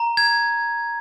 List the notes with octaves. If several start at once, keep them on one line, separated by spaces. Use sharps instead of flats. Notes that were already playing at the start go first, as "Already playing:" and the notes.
Already playing: A#5
G#6